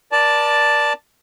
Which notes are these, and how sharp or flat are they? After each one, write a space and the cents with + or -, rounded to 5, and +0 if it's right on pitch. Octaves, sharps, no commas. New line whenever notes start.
A#4 +40 D5 +0 A5 +0